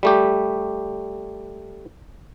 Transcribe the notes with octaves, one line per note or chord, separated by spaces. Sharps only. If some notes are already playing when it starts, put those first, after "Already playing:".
G3 A3 G4